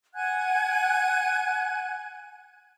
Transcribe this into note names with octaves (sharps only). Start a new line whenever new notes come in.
F#5 G#5 F#6 G#6